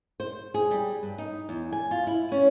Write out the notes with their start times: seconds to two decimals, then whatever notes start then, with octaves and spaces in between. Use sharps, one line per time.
0.20 C5
0.54 G#4
0.71 G3
1.03 G2
1.18 D#4
1.49 E2
1.72 G#5
1.91 F4
2.07 E4
2.32 C#4